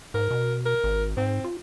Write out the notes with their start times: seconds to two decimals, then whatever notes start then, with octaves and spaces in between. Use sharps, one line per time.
0.14 G#2 A#4
0.31 B2
0.65 A#4
0.84 G#1
1.17 G#2 C4
1.44 F4